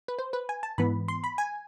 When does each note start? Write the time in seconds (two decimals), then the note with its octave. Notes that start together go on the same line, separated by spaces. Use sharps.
0.08 B4
0.19 C5
0.33 B4
0.49 G#5
0.63 A5
0.78 G#2 E3 B3 B5
1.08 C6
1.24 B5
1.38 G#5